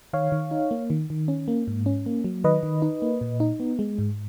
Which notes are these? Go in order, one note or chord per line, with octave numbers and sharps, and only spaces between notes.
D#3 C#5 F5
D#3
D#4
A#3
D#3
D#3
C#4
A#3
G#2
C#4
A#3
F#3
D#3 B4 D#5
D#3
D#4
A#3
A#2
D#4
B3
G#3
G#2